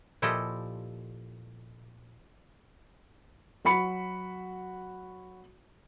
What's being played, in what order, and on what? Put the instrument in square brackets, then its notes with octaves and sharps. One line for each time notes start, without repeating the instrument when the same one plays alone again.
[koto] A#2 F3 E4 G4 A4 D#5
[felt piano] F#3 F#4 B5 C#7